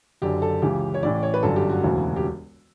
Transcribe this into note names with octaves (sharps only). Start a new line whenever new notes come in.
F#1 F#2 D3 G4
A4
C#2 C#3 E3 G4
C#5
A1 A2 E3 D5
C#5
B4
G1 F#2 D3 A4
G4
F#4
E1 D2 C#3 E3
G4